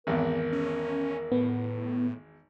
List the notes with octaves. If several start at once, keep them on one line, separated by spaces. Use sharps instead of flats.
G#1 E2 A#4
C#4
A2 B3